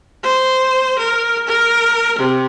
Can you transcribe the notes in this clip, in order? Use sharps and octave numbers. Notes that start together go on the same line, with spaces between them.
C5
A#4
A#4
C3